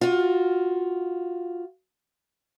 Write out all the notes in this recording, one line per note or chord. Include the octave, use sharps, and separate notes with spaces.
F4 F#4